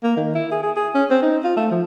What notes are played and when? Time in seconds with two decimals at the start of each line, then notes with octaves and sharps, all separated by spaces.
0.03 A#3
0.17 D#3
0.35 E4
0.52 G#4
0.63 G#4
0.76 G#4
0.95 C#4
1.11 C4
1.22 D#4
1.44 F4
1.57 A3
1.71 F3